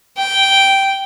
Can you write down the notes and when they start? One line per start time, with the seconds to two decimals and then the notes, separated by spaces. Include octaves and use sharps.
0.17 G5